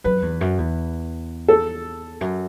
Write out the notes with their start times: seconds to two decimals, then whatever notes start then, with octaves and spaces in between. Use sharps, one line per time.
0.04 F#2 B4
0.22 E2
0.41 F#2
0.58 E2
1.48 A4
2.21 F#2